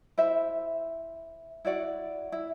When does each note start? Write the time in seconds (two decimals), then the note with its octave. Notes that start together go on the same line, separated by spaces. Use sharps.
0.18 E4 C5 E5
1.65 E4 F#4 D5 F#5
2.32 E4